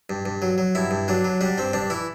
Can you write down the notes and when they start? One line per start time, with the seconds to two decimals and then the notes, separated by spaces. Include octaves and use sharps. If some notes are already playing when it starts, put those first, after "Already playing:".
0.10 G2
0.26 G2
0.42 F#3
0.58 F#3
0.75 G2 E4
0.91 G2
1.08 F#3 D4
1.24 F#3
1.41 G3 D4
1.58 G2 C4
1.73 G2 D4
1.90 E3 E4